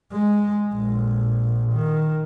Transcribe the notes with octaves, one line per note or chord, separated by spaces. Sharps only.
G#3
A#1
D#3